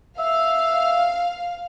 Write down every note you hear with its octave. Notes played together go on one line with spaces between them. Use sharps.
E5 F5